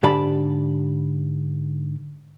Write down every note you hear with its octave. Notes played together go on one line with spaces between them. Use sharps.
G#2 D3 G4 D5 A5 B5